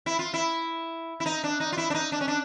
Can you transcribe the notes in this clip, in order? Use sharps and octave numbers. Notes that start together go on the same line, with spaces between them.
E4
F4
E4
E4
D#4
D4
D#4
F4
E4
D4
D#4
D4
C#4
D4